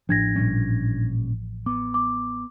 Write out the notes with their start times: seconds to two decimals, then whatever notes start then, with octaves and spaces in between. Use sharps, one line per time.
0.09 A1 A2 F3 D4 G#6 A#6
0.36 A#2 G3 C#4
1.66 B3 D6
1.94 D6